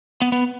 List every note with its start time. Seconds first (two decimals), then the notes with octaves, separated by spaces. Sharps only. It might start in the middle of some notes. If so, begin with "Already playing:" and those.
0.22 B3
0.32 B3